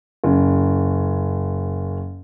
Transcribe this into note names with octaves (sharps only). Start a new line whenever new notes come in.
F#1 C#4